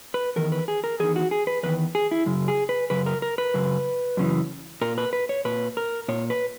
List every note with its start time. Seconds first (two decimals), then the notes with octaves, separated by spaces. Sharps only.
0.14 B4
0.36 E2 D#3 A#4
0.52 B4
0.68 G#4
0.84 A#4
1.00 E2 D#3 G#4
1.16 F#4
1.31 G#4
1.47 B4
1.63 E2 D#3 B4
1.95 G#4
2.11 E4
2.26 F#2 C#3
2.48 G#4
2.69 B4
2.90 F#2 C#3 B4
3.06 A#4
3.22 A#4
3.38 B4
3.54 F#2 C#3
4.17 F#2 C#3 E3
4.81 A#2 A#4
4.98 B4
5.13 B4
5.29 C#5
5.45 A#2 B4
5.77 A#4
6.08 A#2 C#5
6.30 B4